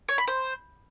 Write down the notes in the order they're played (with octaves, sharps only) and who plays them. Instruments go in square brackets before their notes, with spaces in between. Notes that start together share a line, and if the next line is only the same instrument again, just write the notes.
[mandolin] C#5
B5
C5